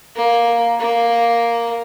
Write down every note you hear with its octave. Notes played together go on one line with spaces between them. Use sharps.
A#3
A#3